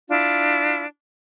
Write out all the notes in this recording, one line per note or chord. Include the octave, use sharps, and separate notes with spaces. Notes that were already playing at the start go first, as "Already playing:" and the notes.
D4 E4 F4